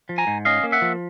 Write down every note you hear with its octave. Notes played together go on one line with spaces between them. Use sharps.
F3
G#5 A#5
G#2
C#4 D#5 F5
A#3
E5 F#5
F3